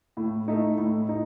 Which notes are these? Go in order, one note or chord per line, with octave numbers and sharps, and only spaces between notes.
A2
A3 D#4
A2
D#4